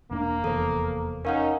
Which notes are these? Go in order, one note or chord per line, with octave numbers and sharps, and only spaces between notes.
E1 A#3 C#4 D4
F1 E2 A4 C5
C#4 D#4 A#4 F5 F#5